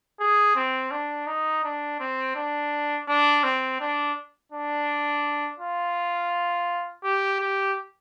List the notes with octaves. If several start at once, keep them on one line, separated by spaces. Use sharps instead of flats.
G#4
C4
D4
D#4
D4
C4
D4
D4
C4
D4
D4
F4
G4
G4